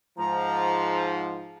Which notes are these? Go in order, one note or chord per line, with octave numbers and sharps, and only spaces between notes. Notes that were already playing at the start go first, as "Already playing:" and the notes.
G#2 F3 A#5